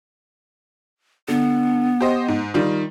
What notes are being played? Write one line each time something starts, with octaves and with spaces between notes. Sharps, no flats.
D3 B3
G4 C5 D#5
G#2
D#3 G3 F4